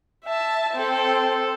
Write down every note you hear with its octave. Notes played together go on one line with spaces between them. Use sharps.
E5 A5
C4 A4